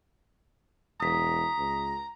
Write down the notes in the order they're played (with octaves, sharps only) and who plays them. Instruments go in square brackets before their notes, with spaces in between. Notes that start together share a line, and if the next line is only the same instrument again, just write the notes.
[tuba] E1 [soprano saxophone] A#5 [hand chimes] D#6 B6
[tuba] C#2